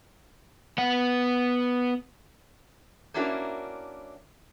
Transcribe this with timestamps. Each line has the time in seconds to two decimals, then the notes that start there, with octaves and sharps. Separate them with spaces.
0.78 B3 F#5
3.14 A#3 C#4 D4 E4 F#4 A#4